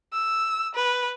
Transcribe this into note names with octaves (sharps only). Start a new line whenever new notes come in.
E6
B4